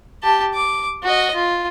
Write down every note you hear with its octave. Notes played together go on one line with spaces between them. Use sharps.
G4 A5
D6
F#4 D#5
F4